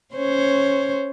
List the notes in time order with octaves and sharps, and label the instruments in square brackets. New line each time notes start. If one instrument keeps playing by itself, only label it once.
[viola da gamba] C#4 C5 C#5